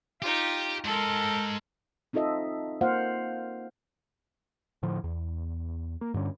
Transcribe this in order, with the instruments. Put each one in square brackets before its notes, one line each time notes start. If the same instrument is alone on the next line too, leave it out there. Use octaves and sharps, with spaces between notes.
[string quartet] D#4 F4 [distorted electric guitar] G4
[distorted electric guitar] G#2 [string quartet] A4 A#4
[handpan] C4 D#4 F4 A4 D#5 E5
A#3 F4 C5 F5 F#5
[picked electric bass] A2 D3 F3
E2
A#3
G2 D3 C#4